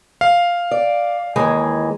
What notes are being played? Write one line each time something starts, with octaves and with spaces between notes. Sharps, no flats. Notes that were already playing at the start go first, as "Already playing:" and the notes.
F5
D5
D#2 E3 G#3